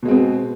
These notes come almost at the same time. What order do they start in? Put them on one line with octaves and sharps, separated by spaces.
B2 G#3 C4 B3